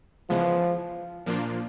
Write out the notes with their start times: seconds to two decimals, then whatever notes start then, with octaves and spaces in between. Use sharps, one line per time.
0.29 C#3 E3 F3 G#3 B3
1.26 A#2 F3 A#3 D4 F4